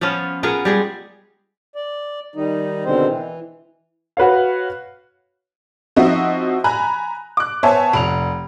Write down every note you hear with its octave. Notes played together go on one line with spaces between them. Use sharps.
F3 B3 C#4 F4
B3 F4 G#4 A#4
G3 G#3 G#4
D5
D#3 G3 D#4
B2 D3 D#3 G#3 C4 C5
E3
F#4 B4 C#5 F5
F3 C4 D#4 F#4 D#5 E5
G#5 A#5 B5 F#6
D6 F#6
B3 C5 C#5 E5 G#5 A5
F1 F7